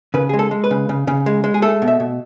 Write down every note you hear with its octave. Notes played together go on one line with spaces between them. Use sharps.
C#3 B4
G#3 G#4
A4
G#3
B4
C#3
C#3
C#3
G#3
G#3
G#4
A3 A4
B2
E5
B2